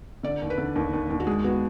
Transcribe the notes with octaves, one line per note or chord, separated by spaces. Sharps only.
D3 D5
D#2
B4
D3
D#2
D#2
D#2
F#4
G#3 G#4
B3 F#4